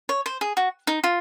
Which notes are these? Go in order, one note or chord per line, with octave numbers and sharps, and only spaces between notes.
C#5
C5
G#4
F#4
D#4
F4